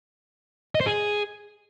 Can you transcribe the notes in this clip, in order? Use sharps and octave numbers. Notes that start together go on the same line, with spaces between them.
D#5
C5
G#4